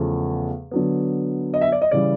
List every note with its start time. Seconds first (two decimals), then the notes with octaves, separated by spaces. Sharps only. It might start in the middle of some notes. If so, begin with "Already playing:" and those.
Already playing: E2 C#3 F3 A3
0.71 D3 F#3 B3
1.54 D#5
1.61 E5
1.72 D5
1.82 D#5
1.91 C#3 E3 G3 D5